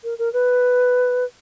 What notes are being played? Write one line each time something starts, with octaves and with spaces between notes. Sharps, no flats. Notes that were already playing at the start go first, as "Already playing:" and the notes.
A#4
A#4
B4